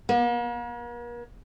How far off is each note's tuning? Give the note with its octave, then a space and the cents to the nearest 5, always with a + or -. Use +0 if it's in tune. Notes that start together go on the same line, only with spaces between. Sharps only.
A#3 +45